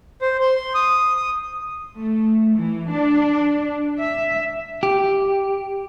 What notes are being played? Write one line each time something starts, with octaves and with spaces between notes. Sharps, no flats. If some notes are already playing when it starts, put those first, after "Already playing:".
C5
C6
C6
D#6
D#6
A3
E3
D4
E5
G4